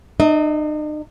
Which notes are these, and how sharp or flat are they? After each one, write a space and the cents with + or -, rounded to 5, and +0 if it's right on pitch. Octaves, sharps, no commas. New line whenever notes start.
D#4 -45 D#5 +35